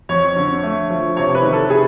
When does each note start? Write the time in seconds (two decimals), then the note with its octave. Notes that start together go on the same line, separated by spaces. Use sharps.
0.09 F2 C#5
0.37 D3
0.63 A3
0.90 F3
1.17 C3 C#5
1.35 B4
1.43 D#3
1.53 A4
1.70 C3 G#4